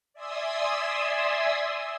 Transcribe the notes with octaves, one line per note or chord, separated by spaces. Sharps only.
D5 E5 G#5 C6 D#6 E6